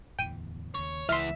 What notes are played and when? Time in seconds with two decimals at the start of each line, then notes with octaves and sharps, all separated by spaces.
0.19 D1 E2 E3 G5 D#7
0.75 D#2 C#3 C#5
1.09 C#2 E3 B3 E5 C6 F6